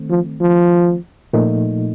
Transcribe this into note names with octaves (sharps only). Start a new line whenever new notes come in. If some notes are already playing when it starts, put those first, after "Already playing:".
Already playing: D#3 A3 C4
F3
F3
A#2 F3 A3 D#4